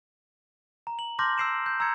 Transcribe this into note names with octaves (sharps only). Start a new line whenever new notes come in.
A#5
F#7
A5 C6 D6 F6 G6 A#6
D6 E6 G6 C7 D7 E7
G6
A#5 E6 F#6 G#6 C#7